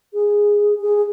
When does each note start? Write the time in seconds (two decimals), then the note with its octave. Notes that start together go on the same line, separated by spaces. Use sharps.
0.14 G#4
0.81 G#4